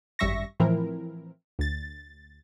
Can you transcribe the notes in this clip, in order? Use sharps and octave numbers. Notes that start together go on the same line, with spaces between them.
G#1 F#2 G3 E5 C#6 A#6
A2 E3 F3 C4 E4 A#4
D2 A6